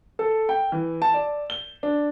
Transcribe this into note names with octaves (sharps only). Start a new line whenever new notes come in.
A4
G5
E3
A5
D5
G7
D4